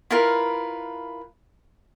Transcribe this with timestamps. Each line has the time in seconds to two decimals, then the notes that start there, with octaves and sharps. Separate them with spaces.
0.11 E4 F4 A#4 B4